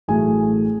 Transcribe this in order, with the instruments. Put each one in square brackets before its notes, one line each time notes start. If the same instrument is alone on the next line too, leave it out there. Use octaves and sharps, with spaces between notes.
[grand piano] A1 A2 F#3 A3 G#4 G#5